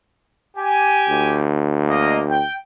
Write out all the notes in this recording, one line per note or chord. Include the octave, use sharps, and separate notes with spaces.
G4 G#5
D2
A#3 D#5
G5